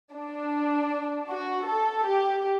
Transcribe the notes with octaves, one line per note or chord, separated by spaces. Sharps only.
D4
F#4
A4
G4